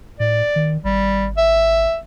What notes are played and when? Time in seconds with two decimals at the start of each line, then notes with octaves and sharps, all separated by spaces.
0.20 A2 D5
0.56 D#3
0.84 G#1 G3
1.37 E5